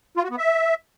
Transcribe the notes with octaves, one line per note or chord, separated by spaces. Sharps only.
F4
F#4
B3
E5